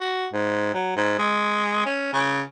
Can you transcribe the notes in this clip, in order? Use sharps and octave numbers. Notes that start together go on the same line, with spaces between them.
F#4
G#2
F#3
G#2
G#3
C#4
C#3